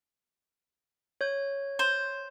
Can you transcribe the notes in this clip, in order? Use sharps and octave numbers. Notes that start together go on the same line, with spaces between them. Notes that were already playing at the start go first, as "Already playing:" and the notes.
C#5 G6
C5